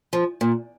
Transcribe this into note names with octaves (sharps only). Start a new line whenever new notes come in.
F3
A#2